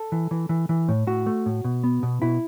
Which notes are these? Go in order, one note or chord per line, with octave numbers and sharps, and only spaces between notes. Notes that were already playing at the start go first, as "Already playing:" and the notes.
Already playing: A4
E3
E3
E3
E3
A2
A2 F#4
A3
A2
B2
B3
B2
B2 E4